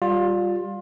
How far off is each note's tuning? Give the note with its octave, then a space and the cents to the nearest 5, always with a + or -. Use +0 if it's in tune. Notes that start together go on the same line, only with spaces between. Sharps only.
G3 +0 F4 +20